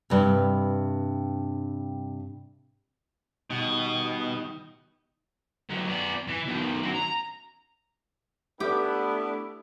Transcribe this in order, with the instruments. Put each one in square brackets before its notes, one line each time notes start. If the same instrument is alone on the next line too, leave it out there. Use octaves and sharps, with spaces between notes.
[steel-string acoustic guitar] G2 C3
[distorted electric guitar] B2 [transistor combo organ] D#3 G3 D#4
[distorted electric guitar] D#3 F#3
B3 D5
E3
B2 D#3
C#4 F#4
A#5
[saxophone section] A3 D4 E4 [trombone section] B3 [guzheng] G4